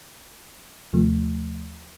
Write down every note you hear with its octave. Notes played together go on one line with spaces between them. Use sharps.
D#2 C3 F3 A3